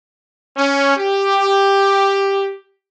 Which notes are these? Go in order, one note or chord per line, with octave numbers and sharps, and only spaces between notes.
C#4
G4